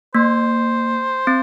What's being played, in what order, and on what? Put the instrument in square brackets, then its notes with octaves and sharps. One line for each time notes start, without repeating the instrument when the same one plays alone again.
[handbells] A#3 [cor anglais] C5
[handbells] C4